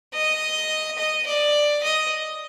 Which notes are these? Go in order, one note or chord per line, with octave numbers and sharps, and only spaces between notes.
D#5
D#5
D5
D#5